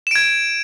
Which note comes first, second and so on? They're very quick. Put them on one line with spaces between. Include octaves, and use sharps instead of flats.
E7 D7 G#6